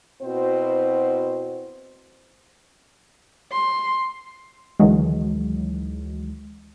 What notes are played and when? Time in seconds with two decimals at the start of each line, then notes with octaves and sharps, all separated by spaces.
0.21 B2 C4 E4 F#4 C5
3.52 C6
4.80 D2 D#3 E3 F#3 G#3